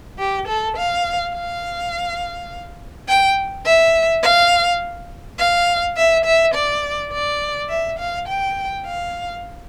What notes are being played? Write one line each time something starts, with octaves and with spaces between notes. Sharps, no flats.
G4
A4
F5
F5
G5
E5
F5
F5
E5
E5
D5
D5
E5
F5
G5
F5